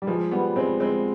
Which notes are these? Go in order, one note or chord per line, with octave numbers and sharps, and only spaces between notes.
G3
F3 G#3
G3 B3
G#3 C4
G#3 C4